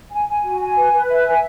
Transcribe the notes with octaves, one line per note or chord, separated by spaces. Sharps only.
G#5
G#5
F#4
G#5
B4
B4
E5
G#5